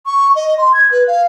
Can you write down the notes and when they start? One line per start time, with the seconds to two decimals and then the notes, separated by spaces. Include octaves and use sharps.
0.06 C#6
0.35 D#5
0.58 C6
0.73 G#6
0.92 B4
1.07 F5